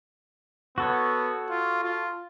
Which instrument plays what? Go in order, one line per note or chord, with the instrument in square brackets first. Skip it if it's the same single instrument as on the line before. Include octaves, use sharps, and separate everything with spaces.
[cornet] B3 [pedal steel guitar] F#4 A4 C#5
[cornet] F4
F4